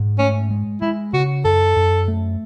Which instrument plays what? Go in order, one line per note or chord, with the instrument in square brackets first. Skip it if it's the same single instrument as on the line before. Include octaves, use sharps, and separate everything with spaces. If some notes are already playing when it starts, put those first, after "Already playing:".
Already playing: [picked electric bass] G#2
[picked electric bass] A3 [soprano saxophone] C#4
[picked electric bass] G#3
[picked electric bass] G#3 [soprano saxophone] E4
[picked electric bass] C#3 [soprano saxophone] F#4
[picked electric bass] F#2 [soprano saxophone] A4
[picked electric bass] F#2
A3